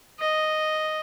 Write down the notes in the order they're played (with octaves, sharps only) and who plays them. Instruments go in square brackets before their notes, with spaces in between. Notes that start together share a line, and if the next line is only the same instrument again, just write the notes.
[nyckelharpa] D#5